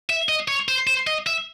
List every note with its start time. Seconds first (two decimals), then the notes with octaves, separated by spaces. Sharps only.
0.10 E5
0.29 D#5
0.48 C#5
0.68 C5
0.87 C5
1.07 D#5
1.27 E5